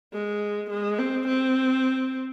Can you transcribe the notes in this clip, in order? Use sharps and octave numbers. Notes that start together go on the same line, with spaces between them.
G#3
G#3
C4
C4